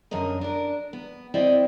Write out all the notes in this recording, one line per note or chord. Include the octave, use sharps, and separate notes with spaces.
F#2 D3 A#4 D#5
D4 A#4
B3
C4 E4 D5 D#5 G5